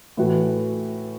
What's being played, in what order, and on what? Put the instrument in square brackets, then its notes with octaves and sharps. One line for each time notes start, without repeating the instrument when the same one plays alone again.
[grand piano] A2 E3 A3 F#4 B4